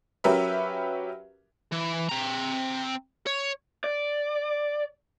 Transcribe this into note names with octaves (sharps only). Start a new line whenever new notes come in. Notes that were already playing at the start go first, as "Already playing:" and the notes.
F#3 C#4 G4 A#4 B4 E5
E3
C4 A#5
C#5
D5